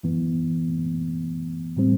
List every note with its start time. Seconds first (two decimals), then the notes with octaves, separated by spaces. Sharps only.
0.03 F#2 E3 B3
1.77 A2 G3 C4